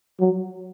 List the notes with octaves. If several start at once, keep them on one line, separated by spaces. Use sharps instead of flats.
F#3